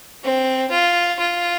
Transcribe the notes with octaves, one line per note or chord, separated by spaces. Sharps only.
C4
F4
F4